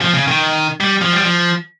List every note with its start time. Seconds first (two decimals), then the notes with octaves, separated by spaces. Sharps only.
0.01 F3
0.14 C#3
0.28 D#3
0.80 G3
1.01 F3
1.13 G3
1.21 F3